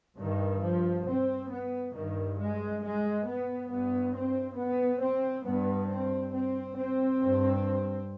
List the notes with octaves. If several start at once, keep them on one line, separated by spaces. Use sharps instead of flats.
G2 D#3
F3
C4
B3
G2 D#3
G#3
G#3
B3
G2 B3
C4
B3
C4
G2 B3
C4
C4
C4
G2